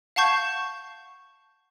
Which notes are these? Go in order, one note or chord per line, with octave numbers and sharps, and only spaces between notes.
F5 F#5 A5 C#6 G6 G#6